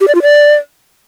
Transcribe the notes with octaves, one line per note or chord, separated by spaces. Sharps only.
G4
D5
F4
D5